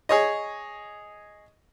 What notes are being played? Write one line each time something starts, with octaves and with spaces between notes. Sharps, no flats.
G#4 C#5 D#5